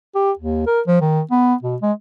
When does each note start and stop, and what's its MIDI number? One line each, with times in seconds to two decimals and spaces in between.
0.15 0.32 67
0.39 0.66 39
0.67 0.81 70
0.87 0.99 53
1.01 1.21 51
1.31 1.55 59
1.63 1.77 47
1.82 1.92 56